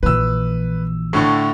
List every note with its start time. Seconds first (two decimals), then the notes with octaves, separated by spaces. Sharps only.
0.03 A#1 E3 B4 E6
1.13 A2 D3 C#6